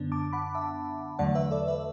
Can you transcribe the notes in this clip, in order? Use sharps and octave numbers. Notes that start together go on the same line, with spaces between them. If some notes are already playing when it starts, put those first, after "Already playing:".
Already playing: F#2 D3 B3 D4
A5 D6
F#5 B5
E5 A5
E2 D3 F#3 A3 D5 F#5
B4 E5
A4 D5
B4 E5